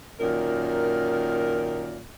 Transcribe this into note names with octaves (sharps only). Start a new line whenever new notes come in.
F#2 A#2 D#3 A#4